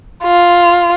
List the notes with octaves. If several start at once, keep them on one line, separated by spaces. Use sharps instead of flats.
F4